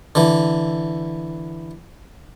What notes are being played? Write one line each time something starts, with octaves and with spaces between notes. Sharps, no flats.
D3 E3